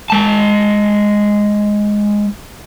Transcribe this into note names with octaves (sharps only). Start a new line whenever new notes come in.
G#3 A5